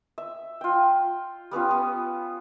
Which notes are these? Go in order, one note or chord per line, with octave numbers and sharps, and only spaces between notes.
E5
F4 G5
G3 B3 C#4 F4
B3 D#6